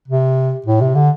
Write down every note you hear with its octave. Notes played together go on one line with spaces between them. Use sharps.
C3
A2
C3
D3